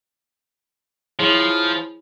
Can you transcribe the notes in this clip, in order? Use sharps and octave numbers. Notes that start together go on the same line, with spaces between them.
F3 E4 G#4 C#5